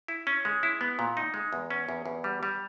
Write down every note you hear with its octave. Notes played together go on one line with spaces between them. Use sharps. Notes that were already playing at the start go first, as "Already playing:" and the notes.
E4
C#4
G#3
E4
B3
A#2
D#4
G#3
E2
C#4
E2
E2
G3
G3